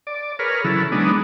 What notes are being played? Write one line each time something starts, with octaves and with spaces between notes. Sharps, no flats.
D5
G#4 A#4 B4 C#5 F6
C#3 E3 F#3 E4 A4
F#3 G#3 B3 D4 D#4